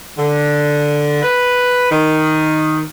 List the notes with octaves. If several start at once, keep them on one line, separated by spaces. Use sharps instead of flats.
D3
B4
D#3